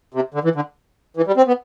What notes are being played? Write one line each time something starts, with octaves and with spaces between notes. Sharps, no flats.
C3
D3
E3
D3
E3
G3
C4
B3